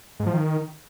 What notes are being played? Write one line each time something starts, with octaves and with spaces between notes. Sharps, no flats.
G#2
F3
D#3